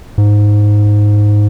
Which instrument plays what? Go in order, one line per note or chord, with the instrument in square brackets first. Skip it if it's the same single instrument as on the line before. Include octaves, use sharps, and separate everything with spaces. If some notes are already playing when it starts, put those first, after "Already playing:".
[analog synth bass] G#2